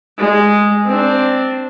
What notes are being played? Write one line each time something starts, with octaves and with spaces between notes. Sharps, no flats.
G#3
C4 D4